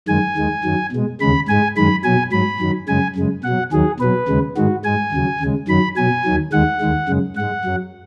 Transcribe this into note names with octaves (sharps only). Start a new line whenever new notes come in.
F#2 D#3 G#3 G#5
D#2 D#3 G#3
F#2 D#3 F#3
B2 G#3
D#2 C#3 G#3 B5
G#2 G#3 G#5
F#2 D#3 G#3 B5
B2 F#3 G#5
G#2 F#3 B5
F#2 D#3 F#3
F#2 C#3 G#3 G#5
F#2 C#3 G#3
B2 F#3 F#5
D#2 D#3 F#3 G#4
B2 F#3 B4
D#2 C#3 G#3
G#2 D#3 G#3 F#4
G#2 G#3 G#5
D#2 C#3 F#3
D#2 C#3 G#3
F#2 D#3 F#3 B5
B2 F#3 G#5
D#2 D#3 F#3
D#2 D#3 G#3 F#5
D#2 D#3 G#3
F#2 C#3 G#3
G#2 G#3 F#5
F#2 F#3